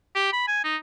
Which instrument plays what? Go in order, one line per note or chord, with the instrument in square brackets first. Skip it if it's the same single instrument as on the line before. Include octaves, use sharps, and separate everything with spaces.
[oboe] G4
B5
G#5
D#4